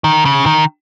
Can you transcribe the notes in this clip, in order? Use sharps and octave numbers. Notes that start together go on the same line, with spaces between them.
D#3
C#3
D#3